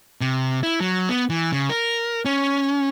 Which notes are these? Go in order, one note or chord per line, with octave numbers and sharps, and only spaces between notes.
C3
E4
F#3
B3
E3
C#3
A#4
C#4